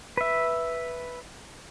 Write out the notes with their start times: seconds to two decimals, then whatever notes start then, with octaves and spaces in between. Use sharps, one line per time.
0.17 B4 E5